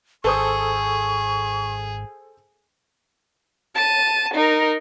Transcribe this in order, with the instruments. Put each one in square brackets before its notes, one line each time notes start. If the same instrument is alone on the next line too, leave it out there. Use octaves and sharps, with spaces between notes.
[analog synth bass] G#1 [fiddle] G#4 [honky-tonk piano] A4 C5 D#6 [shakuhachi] C#6
[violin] A5 D#7
D#4 A#4